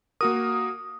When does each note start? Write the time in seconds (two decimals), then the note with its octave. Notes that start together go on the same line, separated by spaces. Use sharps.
0.21 A#3 F#4 A#4 D#6